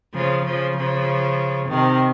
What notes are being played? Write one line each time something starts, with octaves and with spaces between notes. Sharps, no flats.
C#3 F3
C#3 F3
C#3 F3
C3 D#3